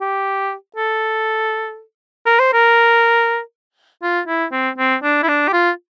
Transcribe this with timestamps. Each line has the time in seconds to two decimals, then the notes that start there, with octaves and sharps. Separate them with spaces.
0.01 G4
0.76 A4
2.26 A#4
2.39 C5
2.53 A#4
4.02 F4
4.27 E4
4.52 C4
4.78 C4
5.03 D4
5.22 E4
5.28 D4
5.48 G4
5.53 F4